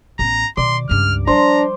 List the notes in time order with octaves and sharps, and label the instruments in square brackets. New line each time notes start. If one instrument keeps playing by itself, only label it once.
[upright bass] A1 B3 [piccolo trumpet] A#5
[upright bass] B2 D#3 [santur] D5 [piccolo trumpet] C6
[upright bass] C#2 G2 [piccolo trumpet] F6
[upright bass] F3 G3 [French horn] D4 [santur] C5 [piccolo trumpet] A#5